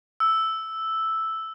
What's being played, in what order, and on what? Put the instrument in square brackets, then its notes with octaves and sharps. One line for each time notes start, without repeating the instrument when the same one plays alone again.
[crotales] E6